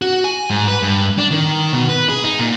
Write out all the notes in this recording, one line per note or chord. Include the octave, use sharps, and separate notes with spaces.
F#4
G#5
G#2
B4
G2
D4
D#3
B2
B4
G#4
D#4
A#2